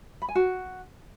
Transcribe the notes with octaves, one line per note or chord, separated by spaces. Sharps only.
B5
G#5
F#4